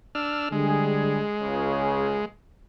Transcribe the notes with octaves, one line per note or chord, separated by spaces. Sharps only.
D4 E6 F6
D3 G3 G#3 G#4
C#2 C#3